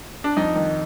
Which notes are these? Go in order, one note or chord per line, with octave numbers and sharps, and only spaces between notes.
D4
F2 D#4
D#3